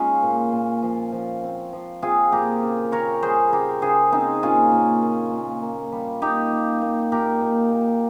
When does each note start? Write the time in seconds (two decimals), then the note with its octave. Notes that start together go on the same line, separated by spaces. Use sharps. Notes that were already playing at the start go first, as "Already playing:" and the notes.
Already playing: G#3 C#4 D#4 F4
0.22 A#2
0.53 A#2
0.83 F3
1.12 F3
1.43 C4
1.73 F3
2.02 C4 F4 G#4
2.32 A#2 G4 A#4
2.63 C#3
2.92 C#3 A#4 C#5
3.23 G3 G#4 C5
3.52 C#3 G4 A#4
3.82 C#3 G#4 C5
4.12 C#3 C4 D#4
4.43 A#2 C#4 F4
4.72 A#2
5.02 A#2
5.32 A#2
5.62 A#3
5.92 G3
6.22 A#3 D#4 G4
6.52 A#3
6.82 A#3
7.12 A#2 G4 A#4
7.41 A#2
7.72 A#2